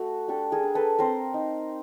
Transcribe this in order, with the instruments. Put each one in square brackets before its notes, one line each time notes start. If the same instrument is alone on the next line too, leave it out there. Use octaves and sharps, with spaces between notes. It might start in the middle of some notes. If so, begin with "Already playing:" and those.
Already playing: [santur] A3 F#4
D4 G4 A4
G#4 A#4
D4
A4 B4
C4 A#4 C5
D#4